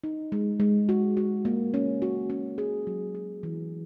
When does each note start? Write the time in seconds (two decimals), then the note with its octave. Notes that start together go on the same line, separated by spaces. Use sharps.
0.04 D#4
0.32 G#3
0.60 G#3
0.89 F#4
1.17 F#4
1.45 A#3
1.74 C#4
2.02 F#4
2.30 C#4
2.58 G#4
2.87 F#3
3.15 G#4
3.43 E3